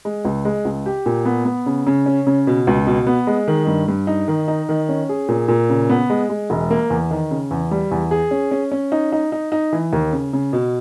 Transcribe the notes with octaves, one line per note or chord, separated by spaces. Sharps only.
G#3
C#2
G#3
C#2
G4
A#2
B3
B3
C#3
C#3
C#4
C#3
B2
C#2
B2
B3
G#3
D#3
G2
G2
D#4
D#3
D#4
D#3
C#4
G#4
A#2
A#2
C#3
B3
G#3
G#3
E1
A#3
E2
D#3
C#3
E2
G3
E2
G#4
C#4
C#4
C#4
D#4
D#4
D#4
D#4
E3
D#2
C#3
C#3
B2